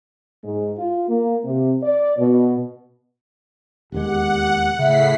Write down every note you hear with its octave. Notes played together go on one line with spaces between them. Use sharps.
G#2
F4
A#3
C3
D5
B2
E1 D#2 G#3 G4 F#5
A2 C#3 E5 B6 C7